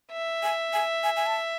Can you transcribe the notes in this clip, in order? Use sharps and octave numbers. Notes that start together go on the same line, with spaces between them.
E5
G#5
G#5
G#5
G#5
A5